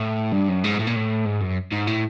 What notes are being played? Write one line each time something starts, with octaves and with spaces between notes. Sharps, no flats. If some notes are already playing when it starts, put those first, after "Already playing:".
Already playing: A2
G2
F#2
G#2
A2
A#2
A2
G#2
F#2
G#2
A2